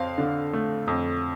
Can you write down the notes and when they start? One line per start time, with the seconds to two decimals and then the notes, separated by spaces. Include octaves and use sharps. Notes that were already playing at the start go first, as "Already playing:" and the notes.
Already playing: F2 C4 F5
0.18 D3
0.53 A3
0.88 F2